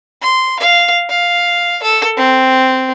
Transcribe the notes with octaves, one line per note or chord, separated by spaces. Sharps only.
C6
F5
F5
A4
C4